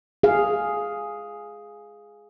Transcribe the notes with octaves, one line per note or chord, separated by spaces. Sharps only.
G#4 F5